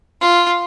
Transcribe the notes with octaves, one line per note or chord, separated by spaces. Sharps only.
F4